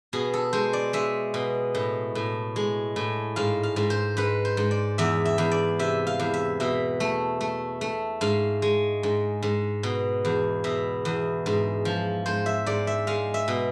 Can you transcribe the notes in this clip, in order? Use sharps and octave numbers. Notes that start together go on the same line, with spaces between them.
B2 G#4
A4
G#3 C5
D5
G#3 E5
B2
A2
A2
G#3
A2
G#2 F5
F5
G#2
C5
G#2 B4
C5
G#2
D5
E2 E5
E5
E2
D5
C3 E5
F5
E2
E5
B2 E5
A3
A3
A3
G#2 F5
G#3
G#2
G#2
B2
E2
B2 E5
E2
G#2
F3
G#2 C5
E5
G#2 D5
E5
G#3 F5
E5
B2